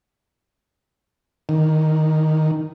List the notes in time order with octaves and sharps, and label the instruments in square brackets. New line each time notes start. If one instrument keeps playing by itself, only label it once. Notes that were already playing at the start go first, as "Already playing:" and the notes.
[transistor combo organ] D#3